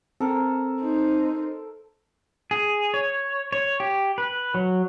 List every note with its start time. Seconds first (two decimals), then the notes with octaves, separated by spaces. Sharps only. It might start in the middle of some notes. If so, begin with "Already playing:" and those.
0.20 C4 A4 A#4
0.81 D#4 C5
2.51 G#4
2.94 C#5
3.52 C#5
3.80 G4
4.18 B4
4.54 F#3